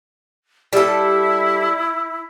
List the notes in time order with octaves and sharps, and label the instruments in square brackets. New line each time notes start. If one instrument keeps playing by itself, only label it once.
[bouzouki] G3 A4 [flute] E4